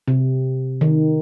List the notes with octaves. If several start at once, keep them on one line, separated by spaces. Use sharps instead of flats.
C3
D#3